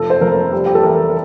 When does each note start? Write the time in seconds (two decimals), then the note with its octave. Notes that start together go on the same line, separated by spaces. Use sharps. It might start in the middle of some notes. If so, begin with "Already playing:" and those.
Already playing: F1 F3 A4
0.10 C5
0.21 F1 A#4
0.52 G3
0.66 G4
0.75 A4
0.83 E3 A#4
1.10 A#4